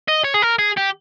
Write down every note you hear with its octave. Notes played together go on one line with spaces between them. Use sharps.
D#5
C#5
G#4
A#4
G#4
G4